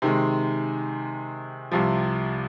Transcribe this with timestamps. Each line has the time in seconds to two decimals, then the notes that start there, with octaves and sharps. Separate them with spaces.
0.02 C3 D#3 G#3
1.71 C2 C3 F3